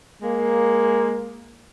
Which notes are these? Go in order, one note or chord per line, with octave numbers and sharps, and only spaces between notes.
G#3 A#3